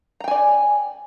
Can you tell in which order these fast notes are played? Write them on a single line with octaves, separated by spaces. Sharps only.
A#5 G5 G#5 D5